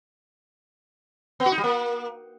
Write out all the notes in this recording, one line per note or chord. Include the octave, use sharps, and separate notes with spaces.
B3
F#4
D#4
G3
A#3